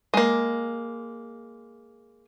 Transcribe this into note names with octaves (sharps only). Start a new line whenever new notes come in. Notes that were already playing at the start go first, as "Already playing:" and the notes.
G#3 A#3